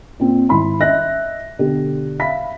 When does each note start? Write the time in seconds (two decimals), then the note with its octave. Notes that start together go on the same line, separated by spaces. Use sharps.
0.19 A#2 C4
0.49 G#1 E4 B5 C6
0.80 D#5 E5 F#6 A#6
1.59 B2 D3 G4
2.19 E5 F5 B5 B6